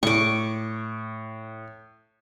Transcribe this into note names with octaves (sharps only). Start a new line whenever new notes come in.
A2 C#6 D6